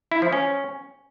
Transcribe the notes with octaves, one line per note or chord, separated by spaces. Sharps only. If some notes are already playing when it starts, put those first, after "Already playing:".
E4
F3
C#4